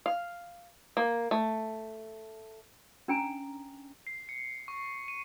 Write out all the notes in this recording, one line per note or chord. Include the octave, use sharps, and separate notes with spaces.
F5
A#3
A3
C#4 D4 G5 G#5 A#5
C7
C#7
C#6
D#7